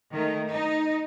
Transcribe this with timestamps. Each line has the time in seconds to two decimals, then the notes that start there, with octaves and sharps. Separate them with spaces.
0.13 D#3 A3
0.51 D#4